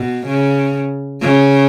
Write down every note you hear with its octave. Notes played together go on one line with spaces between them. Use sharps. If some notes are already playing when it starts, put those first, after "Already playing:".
Already playing: B2
C#3
C#3